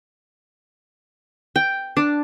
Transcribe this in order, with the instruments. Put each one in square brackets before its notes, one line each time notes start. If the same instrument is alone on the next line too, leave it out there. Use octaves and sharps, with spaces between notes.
[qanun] G5
D4